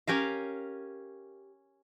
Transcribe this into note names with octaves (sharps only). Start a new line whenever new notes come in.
C#4 G4 A#4 F5